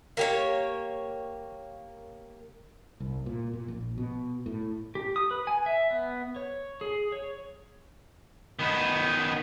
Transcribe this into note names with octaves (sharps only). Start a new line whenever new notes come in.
A#3 G4 C#5
C2
A#2
A#2
A#1
B2
A2
G4
D#6
B4
G#5
E5
B3
C#5
G#4
C#5
D#3 B3